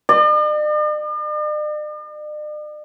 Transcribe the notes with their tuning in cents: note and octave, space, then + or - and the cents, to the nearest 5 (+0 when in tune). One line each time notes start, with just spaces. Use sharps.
D5 +45